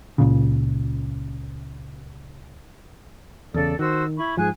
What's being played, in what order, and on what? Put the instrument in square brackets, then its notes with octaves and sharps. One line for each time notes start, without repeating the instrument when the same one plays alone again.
[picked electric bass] C#2 A#2 C#3
[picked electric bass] E2 C#3 [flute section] A4 D5
[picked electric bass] D#3 [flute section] F#4 C5 E6
[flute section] E4 B5 C#6
[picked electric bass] G#2 F3 [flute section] G#4 G#5 F#6